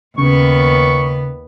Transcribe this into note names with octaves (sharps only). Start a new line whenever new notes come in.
D#2 C#3 B3 C#6